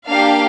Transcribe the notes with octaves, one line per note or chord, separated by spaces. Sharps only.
A#3 D4 G4 F5